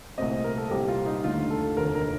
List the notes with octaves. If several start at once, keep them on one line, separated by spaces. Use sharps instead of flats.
C2 A#2 A3 C4 D#5
A#4
A4
C2 A#2 G3 C4 G4
F4
D#4
D#2 D3 A3 F4
A4
F1 D#2 D3 A#4
A#4